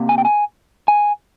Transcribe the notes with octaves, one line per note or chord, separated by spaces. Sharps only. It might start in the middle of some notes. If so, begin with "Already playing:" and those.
Already playing: C3 A#3
G#5
G5
G#5
G#5